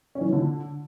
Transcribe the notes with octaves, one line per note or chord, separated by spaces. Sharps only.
C#4
E3
D#4
D3